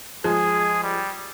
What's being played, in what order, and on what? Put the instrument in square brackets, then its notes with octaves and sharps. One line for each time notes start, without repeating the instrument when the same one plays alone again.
[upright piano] F3 G#3 [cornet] G#4
[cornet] G3